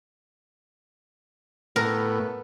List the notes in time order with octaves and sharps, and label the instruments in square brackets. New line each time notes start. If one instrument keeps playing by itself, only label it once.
[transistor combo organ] A2 [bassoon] B3 [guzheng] A#4